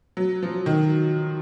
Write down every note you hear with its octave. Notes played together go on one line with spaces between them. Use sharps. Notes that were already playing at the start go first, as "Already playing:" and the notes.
F#3
F3
D#3